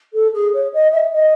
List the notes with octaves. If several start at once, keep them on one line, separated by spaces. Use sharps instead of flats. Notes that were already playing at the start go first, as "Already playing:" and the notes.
A4
G#4
C#5
D#5
E5
D#5